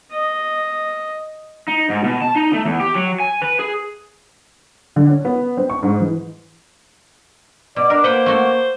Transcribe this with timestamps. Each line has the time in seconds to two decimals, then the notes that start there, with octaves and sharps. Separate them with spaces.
0.12 D#5
1.68 D#4
1.90 G#2
2.04 B2
2.22 A5
2.35 D#4
2.53 A3
2.65 E2
2.80 G4
2.95 F#3
3.20 G#5
3.42 B4
3.59 G#4
4.96 D3
5.09 C#4
5.25 B3
5.57 C4
5.70 C#6
5.83 G#2
6.00 E3
7.76 B2 D5
7.90 D4 A#4
8.04 A#3 B4 C5 F#5 G5
8.26 A3 F#4 A4